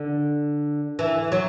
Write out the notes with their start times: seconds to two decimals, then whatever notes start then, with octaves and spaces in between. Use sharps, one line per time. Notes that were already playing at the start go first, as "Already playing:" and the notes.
Already playing: D3
0.99 E3
1.32 F#3